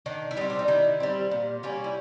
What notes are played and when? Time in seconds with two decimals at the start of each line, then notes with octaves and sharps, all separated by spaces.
0.06 D#3 D4
0.31 E4
0.37 G3 D#4
0.41 C4
0.50 D4
0.59 D#4
0.68 D#3 E4
1.00 G3 C4
1.31 A#2
1.63 G3 A#3 C#4
1.84 E4